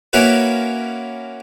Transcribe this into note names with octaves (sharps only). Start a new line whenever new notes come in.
A#3 C#4 E4 F#4 A#4 B4